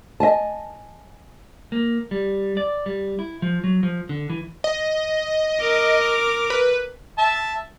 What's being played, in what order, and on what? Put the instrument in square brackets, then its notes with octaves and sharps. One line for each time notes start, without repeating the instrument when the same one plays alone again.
[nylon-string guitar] D#5 E5 G#5 A5
[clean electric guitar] A#3
G3
D5
G3
E4
F3
F#3
F3
D3
E3
[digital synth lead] D#5
[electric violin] A#4 D6
[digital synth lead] B4
[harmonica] E5 A5